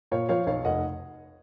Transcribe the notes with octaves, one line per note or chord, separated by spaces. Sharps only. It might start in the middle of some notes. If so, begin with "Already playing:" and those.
A#2 C#5 F5
F3 C#5 F5
B1 C#5 F5
F1 D#5 F#5